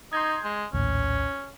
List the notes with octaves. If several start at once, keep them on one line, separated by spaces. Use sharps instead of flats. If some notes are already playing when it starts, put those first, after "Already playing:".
D#4 C6 G6 G#6
G#3
A#1 D#2 A2 C#4